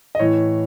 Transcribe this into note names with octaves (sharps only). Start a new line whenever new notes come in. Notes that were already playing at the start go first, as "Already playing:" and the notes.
D#5
A2 E3 C#5